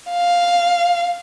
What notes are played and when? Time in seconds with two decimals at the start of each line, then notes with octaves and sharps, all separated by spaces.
0.11 F5